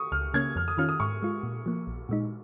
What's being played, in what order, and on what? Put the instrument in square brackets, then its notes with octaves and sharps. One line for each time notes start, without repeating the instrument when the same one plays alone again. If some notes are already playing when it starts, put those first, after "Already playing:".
Already playing: [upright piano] C#6 D#6
[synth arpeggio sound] C#2 [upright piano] F6
[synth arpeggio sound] C#3 A#3 C#4 [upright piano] G#6
[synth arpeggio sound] F2 [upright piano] F6
[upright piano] D#6
[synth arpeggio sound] D#3 C#4 F4 [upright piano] F6
[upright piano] D#6
[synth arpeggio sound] G#2 [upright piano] C#6
[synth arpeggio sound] G#3 F4
A#2
F3 A#3
A#1
A#2 G#3 D#4